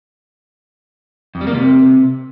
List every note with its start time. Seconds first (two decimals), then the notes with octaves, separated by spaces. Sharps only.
1.35 F2
1.41 G3
1.47 A#3
1.53 C3